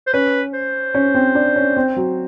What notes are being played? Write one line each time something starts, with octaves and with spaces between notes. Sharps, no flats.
C5
C#4 B4
C5
C#4
C4
D4
C#4
C4
F#3